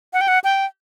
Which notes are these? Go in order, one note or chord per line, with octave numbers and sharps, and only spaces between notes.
F#5
G5
F#5
G5